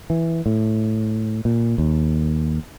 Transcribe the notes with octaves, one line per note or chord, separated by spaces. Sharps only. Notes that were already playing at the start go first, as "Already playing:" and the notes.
E3
A2
A#2
D#2